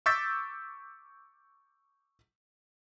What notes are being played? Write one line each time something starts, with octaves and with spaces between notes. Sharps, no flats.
C#6 D6 E6 G6 A6 B6